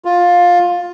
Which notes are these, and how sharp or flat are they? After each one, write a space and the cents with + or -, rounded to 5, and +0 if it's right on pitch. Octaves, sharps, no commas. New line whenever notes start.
F4 +15